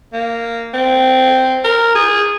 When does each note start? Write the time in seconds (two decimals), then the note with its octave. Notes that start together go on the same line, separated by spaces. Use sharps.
0.13 A#3
0.74 C4
1.64 A#4
1.95 G#4